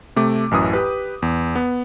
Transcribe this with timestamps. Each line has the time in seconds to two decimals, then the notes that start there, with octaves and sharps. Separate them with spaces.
0.16 C3 A3 D6
0.51 A1 F#2 E3 D#6
0.73 G4 B4
1.22 E2
1.55 B3